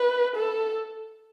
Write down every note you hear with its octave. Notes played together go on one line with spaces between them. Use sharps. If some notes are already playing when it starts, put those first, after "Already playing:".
Already playing: B4
A4